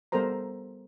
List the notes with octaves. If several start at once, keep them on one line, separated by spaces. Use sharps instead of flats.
G3 B3 A4 A#4 C5 A#5